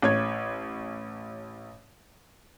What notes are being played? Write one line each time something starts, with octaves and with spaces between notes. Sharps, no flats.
A1 C#5 G#6